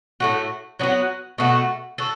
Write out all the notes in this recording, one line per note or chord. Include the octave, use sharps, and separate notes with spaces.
A2 A3 F#4
F#3 B3 D4 F#4
B2 A3 F#4
F#4 A4